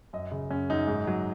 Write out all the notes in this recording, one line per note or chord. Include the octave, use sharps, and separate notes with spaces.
F#2 D#5
C#3
F#2 C#4
F#2 D#4
G#2
F#3